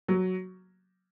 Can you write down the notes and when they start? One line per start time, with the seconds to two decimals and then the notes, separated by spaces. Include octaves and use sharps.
0.08 F#3